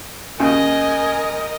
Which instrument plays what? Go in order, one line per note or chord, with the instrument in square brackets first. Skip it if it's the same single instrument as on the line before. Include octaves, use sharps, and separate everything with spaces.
[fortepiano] D#2 C#3 [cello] A#4 D#5 [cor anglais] G#5